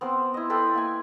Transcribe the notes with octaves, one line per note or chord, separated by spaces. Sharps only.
B3 C4 A#4 C5
E4 D#5
A4 B4 G5 C6
A#3 E5 G#5